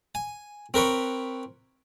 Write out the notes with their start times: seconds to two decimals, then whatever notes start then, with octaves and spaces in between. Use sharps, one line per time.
0.15 G#5
0.74 C4 A#4 B4 C#5